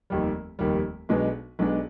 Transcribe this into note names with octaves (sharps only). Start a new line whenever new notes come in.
F1 D#2 D#3 G3
F1 D#2 D#3 G3
B1 B2 G#3 B3 D4
B1 B2 G#3 B3 D4